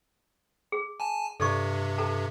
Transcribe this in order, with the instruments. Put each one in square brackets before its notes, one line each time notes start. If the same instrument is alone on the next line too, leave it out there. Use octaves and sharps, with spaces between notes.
[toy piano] G#4
[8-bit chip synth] G#5 A5
[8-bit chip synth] G2 C3 [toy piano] A4 D5 C#6
[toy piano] A4 A5 A#5